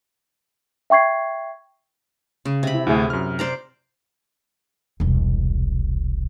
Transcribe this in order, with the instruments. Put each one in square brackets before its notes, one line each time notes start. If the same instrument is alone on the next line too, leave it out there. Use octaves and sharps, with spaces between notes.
[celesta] E5 G5 C#6 G#6 C7
[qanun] C#3
C3 B5
[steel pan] E4
[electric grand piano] D2 A2 [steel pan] E4 G#4
[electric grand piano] F#2 F6
[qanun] C5 D5 A#5
[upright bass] E1 C2